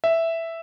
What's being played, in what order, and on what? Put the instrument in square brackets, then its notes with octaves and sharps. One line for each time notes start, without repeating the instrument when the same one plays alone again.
[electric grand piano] E5